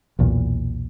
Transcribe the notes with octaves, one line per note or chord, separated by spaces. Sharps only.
B1 E2 A#2